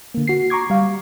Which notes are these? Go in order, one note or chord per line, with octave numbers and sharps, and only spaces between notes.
D3 A#3
F#4 C7
A#5 C#6 D6 G#6
G3 F5